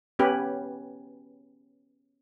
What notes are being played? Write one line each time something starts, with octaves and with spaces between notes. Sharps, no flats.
B3 C#4 G4 B4